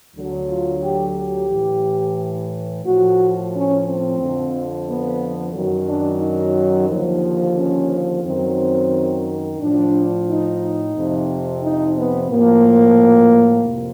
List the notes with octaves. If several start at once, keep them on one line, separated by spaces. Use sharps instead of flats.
D2 D3 F#3
F4
G4
G4
A2 E3
A2 F3 F#4
C#4
C4
F2 D3 F3
B3
F#2 D#3 F#3
D4
D#4
D#2 D3 F3
C#4
F#2 D#3 F#3 C4
A2 F3 D4
D#4
F2 C3 F3
D#4
B3
A2 F3 A#3
F2 C3